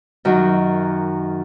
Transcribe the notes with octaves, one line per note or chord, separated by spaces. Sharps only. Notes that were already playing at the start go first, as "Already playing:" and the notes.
F#2 D#3 F#3